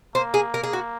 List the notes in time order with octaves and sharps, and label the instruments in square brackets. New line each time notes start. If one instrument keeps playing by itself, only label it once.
[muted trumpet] A#3 [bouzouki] C5
[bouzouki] G#4
A#4
G#4
F#4